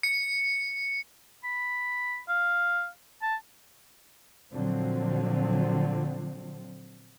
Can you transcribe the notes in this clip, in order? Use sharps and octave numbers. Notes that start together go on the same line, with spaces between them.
C#7
B5
F5
A5
A#2 D3 F3 F#3 C4